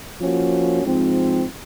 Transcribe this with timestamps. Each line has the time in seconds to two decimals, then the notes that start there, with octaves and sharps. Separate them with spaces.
0.21 F3 A#3 C#4 F#4
0.83 G#2 F3 C4